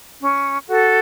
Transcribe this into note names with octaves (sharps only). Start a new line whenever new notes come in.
C#4
F#4 A4